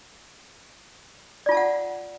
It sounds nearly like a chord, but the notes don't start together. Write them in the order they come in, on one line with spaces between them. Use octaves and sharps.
D5 F4 A5 F5 F#5